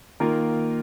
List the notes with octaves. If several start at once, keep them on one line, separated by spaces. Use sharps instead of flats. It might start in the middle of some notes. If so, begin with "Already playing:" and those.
D#3 A#3 F4 A#4